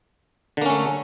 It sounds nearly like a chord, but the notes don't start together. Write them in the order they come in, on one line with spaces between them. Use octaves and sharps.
D3 A#3 C#4 A3